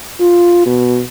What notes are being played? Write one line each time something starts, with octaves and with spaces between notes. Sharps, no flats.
F4
B2